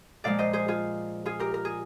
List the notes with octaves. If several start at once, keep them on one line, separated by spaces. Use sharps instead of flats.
A#2 F3 G#3 D5 F5
C5 D#5
G#4 C5
F4 G#4
F4 G#4
G4 A#4
A#4
G#4